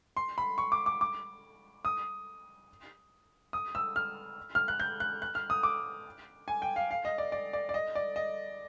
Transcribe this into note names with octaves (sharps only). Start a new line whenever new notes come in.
C6
B5
C#6
D6
D6
D6
D#6
D#6
E6
F6
F6
F#6
G6
F#6
F#6
F6
D#6
D6
G#5
G5
F5
F5
D#5
D5
D5
D5
D5
D#5
D5
D#5